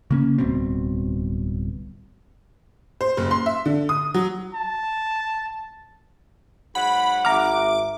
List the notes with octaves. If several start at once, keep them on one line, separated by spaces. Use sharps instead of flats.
C#3 A#3 C#4
D1 C2 B2 C4
C5
F#1
C6
E5
D3
D#6
F#3
A5
G#2 F#3 F#5 B5
G#1 E5 A#5 D6 F6